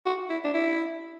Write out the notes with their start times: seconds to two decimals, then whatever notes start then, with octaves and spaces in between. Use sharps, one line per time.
0.06 F#4
0.30 E4
0.44 D4
0.54 E4